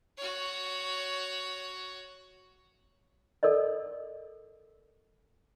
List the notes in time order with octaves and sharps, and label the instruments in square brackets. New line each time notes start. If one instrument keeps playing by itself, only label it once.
[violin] F#4 C#5
[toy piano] A4 A#4 D5 D#5